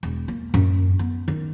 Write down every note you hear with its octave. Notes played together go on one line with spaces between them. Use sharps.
E1
A#3
F#2
B3
D#3